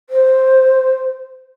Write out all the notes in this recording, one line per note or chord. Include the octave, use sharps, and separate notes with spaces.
C5